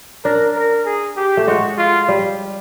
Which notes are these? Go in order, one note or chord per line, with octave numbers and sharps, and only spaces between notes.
D4 A#4
A#4
G#4
G4
A3
G#3 F#4
F4
G3